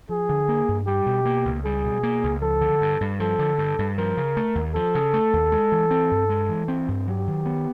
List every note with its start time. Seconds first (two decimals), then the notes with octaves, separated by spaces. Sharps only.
0.09 F3 G#4
0.29 D3
0.48 A#3
0.68 G2
0.87 G3 G4
1.06 B2
1.25 A#3
1.45 C#2
1.65 G3 G#4
1.84 B2
2.03 A#3
2.24 C#2
2.42 F3 A4
2.61 D3
2.81 G2
3.01 G2
3.20 F3 A4
3.39 D3
3.58 G2
3.79 G2
3.98 F3 A#4
4.17 C#3
4.37 A3
4.55 D#2
4.74 F3 A4
4.95 C#3
5.14 A3
5.33 D#2
5.52 G#3
5.72 E3
5.91 C4
6.11 G2
6.30 G#3
6.49 E3
6.68 C4
6.88 G2
7.08 F#3 G4
7.27 D#3
7.46 B3